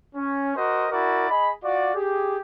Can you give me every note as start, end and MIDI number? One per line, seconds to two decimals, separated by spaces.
0.15 0.51 61
0.55 0.86 66
0.55 0.86 70
0.55 0.86 72
0.55 0.86 75
0.91 1.27 64
0.91 1.27 66
0.91 1.27 70
0.91 1.27 74
1.29 1.50 68
1.29 1.50 75
1.29 1.50 83
1.63 1.94 65
1.63 1.94 66
1.63 1.94 74
1.94 2.38 67
1.94 2.38 68